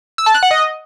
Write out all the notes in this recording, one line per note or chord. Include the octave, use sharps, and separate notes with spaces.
E6
A5
F#6
F#5
D#5